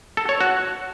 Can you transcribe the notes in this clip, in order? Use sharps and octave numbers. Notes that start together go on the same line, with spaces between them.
A4
C#5
F#4